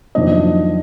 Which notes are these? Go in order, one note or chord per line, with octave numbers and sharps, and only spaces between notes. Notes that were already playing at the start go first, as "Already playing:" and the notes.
F2 D#3 F#3 A#3 D4 D#5